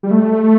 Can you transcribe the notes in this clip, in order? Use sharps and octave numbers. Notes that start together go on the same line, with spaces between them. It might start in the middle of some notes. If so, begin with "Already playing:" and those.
G3
A3